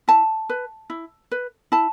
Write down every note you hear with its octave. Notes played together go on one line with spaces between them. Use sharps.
E4 A5
B4
E4
B4
E4 A5